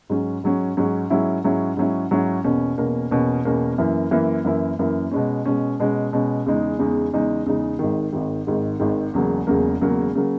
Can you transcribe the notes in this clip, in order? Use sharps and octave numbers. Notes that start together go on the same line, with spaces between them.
G#2 F#3 C#4
G#2 F#3 C#4
G#2 F#3 C#4
G#2 F#3 C#4 E4
G#2 F#3 C#4 E4
G#2 F#3 C#4 E4
G#2 F#3 C#4 E4
E2 B2 A#3 C#4
E2 B2 A#3 C#4
E2 B2 A#3 C#4
E2 B2 A#3 C#4
F#2 E3 A#3 E4
F#2 E3 A#3 E4
F#2 E3 A#3 E4
F#2 E3 A#3 E4
B2 G#3 C#4
B2 G#3 C#4
B2 G#3 C#4
B2 G#3 C#4
E2 C#3 G#3 D#4
E2 C#3 G#3 D#4
E2 C#3 G#3 D#4
E2 C#3 G#3 D#4
G#1 G#2 D#3
G#1 G#2 D#3
G#1 G#2 D#3
G#1 G#2 D#3
E1 E2 C#3 F#3 A#3
E1 E2 C#3 F#3 A#3
E1 E2 C#3 F#3 A#3
C#3 F#3 A#3